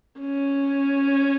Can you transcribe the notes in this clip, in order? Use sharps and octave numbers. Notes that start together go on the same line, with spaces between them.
C#4